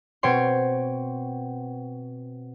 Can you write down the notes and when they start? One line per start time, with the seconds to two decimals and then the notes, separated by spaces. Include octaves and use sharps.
0.23 B2 C4 C#5 G5 C6